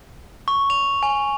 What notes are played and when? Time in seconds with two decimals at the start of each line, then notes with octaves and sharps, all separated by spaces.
0.48 C#6
0.70 F7
1.03 G#5